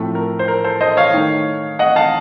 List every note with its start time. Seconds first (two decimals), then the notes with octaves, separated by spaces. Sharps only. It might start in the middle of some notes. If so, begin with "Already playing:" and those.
Already playing: A2 F3 A3 C4
0.15 A#4
0.39 C5
0.48 A#4
0.64 A4 C5
0.81 C5 D#5
0.97 C#5 F5
1.14 D#3 A3 D#4
1.79 D#5 F#5
1.96 F5 A5